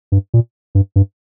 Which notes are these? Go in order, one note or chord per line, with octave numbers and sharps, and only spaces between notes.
G2
A#2
G2
G2